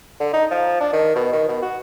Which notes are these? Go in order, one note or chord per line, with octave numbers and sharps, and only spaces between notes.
D3
D#4
F3
D4
D#3
B2
D#3
B2
F#4